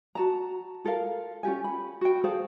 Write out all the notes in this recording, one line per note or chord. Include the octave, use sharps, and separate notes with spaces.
F#4 A5 A#5
F4 A4 A#4 F5
C#4 F4 G4 G#5
B5
F#4 G5
G#4 A4 C5 F5